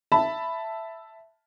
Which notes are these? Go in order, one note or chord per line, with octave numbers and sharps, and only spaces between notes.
E5 A5 B5